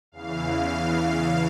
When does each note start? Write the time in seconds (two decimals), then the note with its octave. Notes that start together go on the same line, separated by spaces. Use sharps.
0.12 E2 C#3 E3 F5
0.41 F5